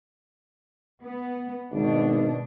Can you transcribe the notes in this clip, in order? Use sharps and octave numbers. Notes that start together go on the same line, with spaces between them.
B3
G#1 B2 D4